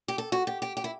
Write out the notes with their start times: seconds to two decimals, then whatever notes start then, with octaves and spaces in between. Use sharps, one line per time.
0.08 G4
0.18 A4
0.32 F#4
0.47 G4
0.62 G4
0.77 G4
0.84 E4